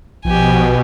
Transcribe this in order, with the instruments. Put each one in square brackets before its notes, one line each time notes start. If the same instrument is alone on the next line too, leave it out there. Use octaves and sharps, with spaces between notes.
[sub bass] A#1 [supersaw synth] B2 [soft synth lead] F3 [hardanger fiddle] G4 G#5